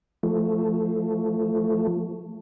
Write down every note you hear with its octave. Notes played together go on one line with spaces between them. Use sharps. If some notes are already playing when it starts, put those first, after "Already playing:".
F3 A3